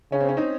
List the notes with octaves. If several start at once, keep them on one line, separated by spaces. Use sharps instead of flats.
C#3 C#4
C4
C#4
C4 D#4